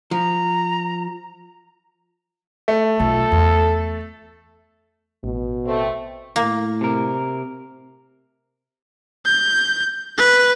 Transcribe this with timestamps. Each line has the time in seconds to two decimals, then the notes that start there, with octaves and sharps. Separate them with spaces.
0.11 F3 A#5
2.68 A3
3.00 B1 F4 A4
3.32 E2
5.24 A1 B2
5.66 A3 C4
6.36 A2 A#3
6.81 C3 A#4
9.25 G6
10.18 B4